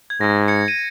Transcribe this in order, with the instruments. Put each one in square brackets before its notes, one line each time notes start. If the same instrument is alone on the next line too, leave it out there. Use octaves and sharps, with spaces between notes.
[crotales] G#6
[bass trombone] G#2 [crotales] A#6
[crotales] G#6 C#7
D#7